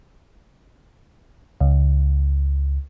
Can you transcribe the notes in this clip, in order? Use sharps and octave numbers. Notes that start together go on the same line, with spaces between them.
C#2